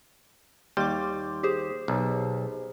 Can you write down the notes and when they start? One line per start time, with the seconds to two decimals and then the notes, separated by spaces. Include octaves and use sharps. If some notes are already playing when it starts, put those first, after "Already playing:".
0.77 D#2 G3 C6 D6
1.43 G4 G#4 C5
1.88 B1